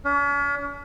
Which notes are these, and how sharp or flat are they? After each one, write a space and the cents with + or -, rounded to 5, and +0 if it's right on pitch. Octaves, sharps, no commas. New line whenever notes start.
C#4 +45